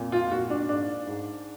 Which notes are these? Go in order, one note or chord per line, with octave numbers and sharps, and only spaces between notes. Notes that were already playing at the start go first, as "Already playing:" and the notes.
Already playing: F2 A#2
F4
A#2 F#4
D4
G#2 D4
G#2